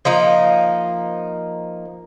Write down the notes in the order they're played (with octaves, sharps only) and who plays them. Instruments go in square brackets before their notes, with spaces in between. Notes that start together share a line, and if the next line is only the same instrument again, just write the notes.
[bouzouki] F3 A#3 D#4